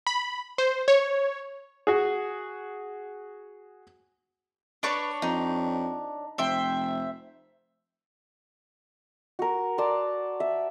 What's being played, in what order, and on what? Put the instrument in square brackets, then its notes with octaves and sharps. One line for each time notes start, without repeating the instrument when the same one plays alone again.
[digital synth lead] B5
C5
C#5
[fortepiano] F#4 G#4
[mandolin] D4 C#5 [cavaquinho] B4 C#6 D6
[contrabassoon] F2 [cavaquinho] D#4
[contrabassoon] F1 [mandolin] C5 E5 G5
[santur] F#4 A#4
D5 A5 A#5 C6
E5